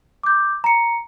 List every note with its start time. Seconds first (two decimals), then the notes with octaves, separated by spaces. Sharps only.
0.23 D6 G6
0.64 A#5 C#7